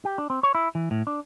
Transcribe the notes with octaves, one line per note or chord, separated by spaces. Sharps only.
G4
D4
C4
C#5
E4
E3
A2
D4